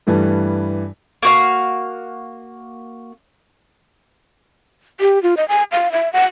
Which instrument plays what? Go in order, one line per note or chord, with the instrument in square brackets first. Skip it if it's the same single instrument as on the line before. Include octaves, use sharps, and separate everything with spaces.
[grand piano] G2 E3 G3 A3 E4
[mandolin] A#3 F#4 F5
[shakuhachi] G4
F4
D#5
G#5
F5
E5
F#5